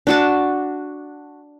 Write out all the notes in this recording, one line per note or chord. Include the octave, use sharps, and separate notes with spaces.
D4 F#4 A5